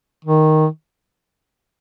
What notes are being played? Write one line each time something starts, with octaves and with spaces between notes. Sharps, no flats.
D#3